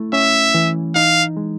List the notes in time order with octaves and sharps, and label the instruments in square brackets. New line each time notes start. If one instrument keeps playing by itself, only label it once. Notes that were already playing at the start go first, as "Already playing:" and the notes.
Already playing: [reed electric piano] A3 E4
[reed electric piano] C#4 [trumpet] E5
[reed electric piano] E3
[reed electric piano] D#4 [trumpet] F5
[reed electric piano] G#3